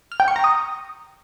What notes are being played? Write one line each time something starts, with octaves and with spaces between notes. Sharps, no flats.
F6
G5
C#6
A#5
D#6